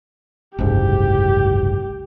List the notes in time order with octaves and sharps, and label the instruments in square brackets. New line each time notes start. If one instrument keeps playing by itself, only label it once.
[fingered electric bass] F#1 C2 G#2 [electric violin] G4